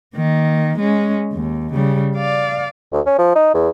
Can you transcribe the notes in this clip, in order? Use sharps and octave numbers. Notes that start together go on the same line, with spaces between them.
D#3 A#3
G#3 C#4
D#2
C#3 G3
D5 F5
D2
C#4
F3
D#4
E2